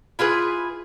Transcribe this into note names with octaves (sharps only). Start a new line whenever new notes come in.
E4 F4 G#4 B4